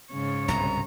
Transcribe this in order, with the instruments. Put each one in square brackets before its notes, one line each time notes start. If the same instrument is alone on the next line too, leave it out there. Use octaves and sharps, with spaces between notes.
[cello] G#2 C#5 [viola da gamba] C#3
[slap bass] C2 G2 B2 [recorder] A#5